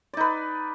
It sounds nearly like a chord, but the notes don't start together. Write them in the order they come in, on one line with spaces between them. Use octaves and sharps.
D5 D#4 B4